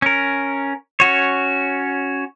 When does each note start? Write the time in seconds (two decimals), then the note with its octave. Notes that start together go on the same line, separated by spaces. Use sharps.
0.02 C#4 A#4
1.00 C#4 F#4 C#5